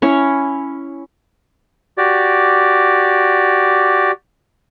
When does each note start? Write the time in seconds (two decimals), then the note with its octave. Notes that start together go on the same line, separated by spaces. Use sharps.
0.02 C#4 E4 C#5
1.98 F#4 G4 D5